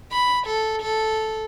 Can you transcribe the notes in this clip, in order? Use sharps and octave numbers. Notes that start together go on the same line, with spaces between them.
B5
A4
A4